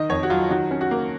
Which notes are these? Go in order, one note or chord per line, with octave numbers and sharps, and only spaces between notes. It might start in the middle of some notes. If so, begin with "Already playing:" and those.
Already playing: D#3 D#5
F2 C#5
F#4
F#3 F4
D#3 F#4
C#4
F#4
A#3